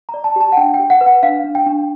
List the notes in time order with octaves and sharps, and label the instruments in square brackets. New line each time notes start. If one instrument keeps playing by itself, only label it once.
[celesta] A#5
D5
A5
G4 A5
F#5
D4 G5
G5
G4
F#5
B4
F#5
D4 F5
D4
G5
D4